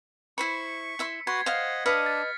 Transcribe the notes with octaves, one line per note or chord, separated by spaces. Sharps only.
E4 C5 B5 C#6 B6 C#7
E4 E5 C6
F#4 B4 F#5 C6 G#6
C5 D#5 F5 F#5
D4 B4 D#5 F5 F6 B6 C#7
A6